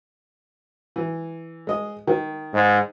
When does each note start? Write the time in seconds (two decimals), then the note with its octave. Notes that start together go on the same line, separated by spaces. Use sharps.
0.96 E3
1.67 G#3 D#5
2.07 D#3
2.54 G#2